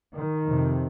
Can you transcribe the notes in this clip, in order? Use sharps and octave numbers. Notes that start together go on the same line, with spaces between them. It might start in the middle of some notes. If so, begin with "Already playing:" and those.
D#3
F2 C3